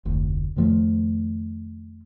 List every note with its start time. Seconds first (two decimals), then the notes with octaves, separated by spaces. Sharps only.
0.05 F1 D2
0.56 F2 D#3 F3 A3